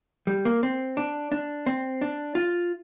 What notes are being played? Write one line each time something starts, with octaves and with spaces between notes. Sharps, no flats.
G3
A#3
C4
D4
D4
C4
D4
F4